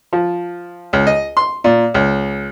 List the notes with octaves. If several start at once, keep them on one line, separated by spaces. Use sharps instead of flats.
F3
C#2
D#5
C6
A#2
C#2